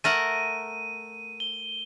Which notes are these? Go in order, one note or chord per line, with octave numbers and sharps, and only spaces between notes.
A3 A#4 F#5 D#7
G7